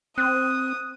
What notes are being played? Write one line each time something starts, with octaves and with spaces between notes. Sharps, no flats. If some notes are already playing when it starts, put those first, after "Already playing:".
C4 D#6 F#6